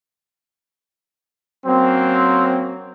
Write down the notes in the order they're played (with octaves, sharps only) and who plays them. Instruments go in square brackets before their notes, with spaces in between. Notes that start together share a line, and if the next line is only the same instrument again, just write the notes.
[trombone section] F#3 A#3 C#4 [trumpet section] C4